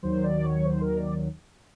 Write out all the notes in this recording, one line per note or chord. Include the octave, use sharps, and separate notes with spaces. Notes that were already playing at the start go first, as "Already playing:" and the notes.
D#2 D#3 F#3 C5
D5
C#5
C5
A#4
D5